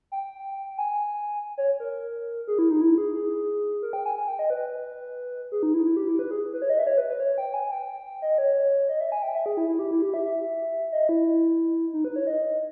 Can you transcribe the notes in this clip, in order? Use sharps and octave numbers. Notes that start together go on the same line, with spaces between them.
G5
G#5
C#5
A#4
G#4
E4
D#4
E4
G#4
G#4
A#4
G5
G#5
G#5
G5
D#5
B4
G#4
D#4
E4
E4
G4
E4
B4
G#4
B4
C#5
D#5
E5
C#5
B4
B4
C#5
G5
G#5
G5
D#5
C#5
D#5
E5
G#5
G5
E5
G#4
E4
E4
G4
E4
G4
E5
E5
D#5
E4
D#4
B4
C#5
D#5